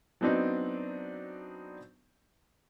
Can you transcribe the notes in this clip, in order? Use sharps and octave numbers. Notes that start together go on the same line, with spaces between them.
F#3 B3 C4 D4 D#4